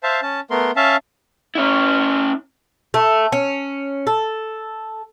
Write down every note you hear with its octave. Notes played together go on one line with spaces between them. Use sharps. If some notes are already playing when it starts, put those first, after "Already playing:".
C5 E5 F5 A5
C#4 A5
A3 B3 A#4 C6
C#4 E5 F5 A5
C#4 E4
A3
C#4
A4